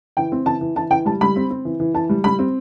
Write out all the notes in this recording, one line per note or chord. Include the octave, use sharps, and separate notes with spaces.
E3 G5
C4
E3 A5
E3
E3 A5
E3 G5
G3 A5
G3 B5
C4
C4
E3
E3
E3 A5
G3
G3 B5
C4